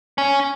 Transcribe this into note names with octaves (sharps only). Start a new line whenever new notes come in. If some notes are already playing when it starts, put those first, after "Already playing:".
C#4